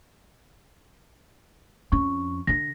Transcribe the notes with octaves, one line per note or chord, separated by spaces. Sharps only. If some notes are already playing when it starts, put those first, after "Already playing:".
F2 C#4 C#6
D3 D4 A#6